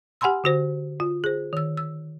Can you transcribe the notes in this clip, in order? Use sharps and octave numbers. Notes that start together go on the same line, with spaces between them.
G4 F#5 G#5 B5 C6 E6
D3 F#4 C5
F4
G#4 C5
D#3 E6
E6